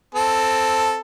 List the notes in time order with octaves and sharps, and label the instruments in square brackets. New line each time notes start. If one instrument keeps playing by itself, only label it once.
[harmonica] C4 A4